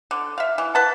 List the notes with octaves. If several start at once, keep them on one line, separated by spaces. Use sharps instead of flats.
D3
E5 F5
E3
B4 F#5 A5